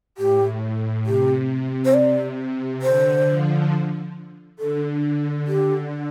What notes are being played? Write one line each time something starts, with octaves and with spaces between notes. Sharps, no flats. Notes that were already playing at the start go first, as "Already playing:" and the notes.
A2 G4
C3 G4
C5
C3 D5
D3 C5
F3
D3 A4
G4